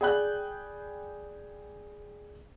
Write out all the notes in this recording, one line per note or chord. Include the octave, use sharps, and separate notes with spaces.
G#4 D5 G5 B5 F#6